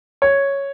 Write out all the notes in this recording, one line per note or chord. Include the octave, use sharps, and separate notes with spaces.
C#5